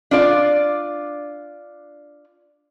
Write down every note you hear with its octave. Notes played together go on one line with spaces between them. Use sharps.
D4 F4 D5